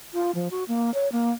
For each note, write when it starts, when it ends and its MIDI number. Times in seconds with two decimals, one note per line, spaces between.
0.14 0.31 65
0.35 0.48 53
0.51 0.64 66
0.68 0.93 58
0.94 1.11 73
1.12 1.31 58